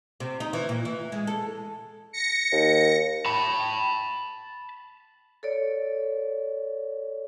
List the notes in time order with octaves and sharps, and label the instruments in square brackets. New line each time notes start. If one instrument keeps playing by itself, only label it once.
[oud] C3
D#4
E3
A#2
E3
G#3
A4
[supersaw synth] A#6 C#7
[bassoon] D#2
[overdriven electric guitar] A5 B5
[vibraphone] A4 C#5 D5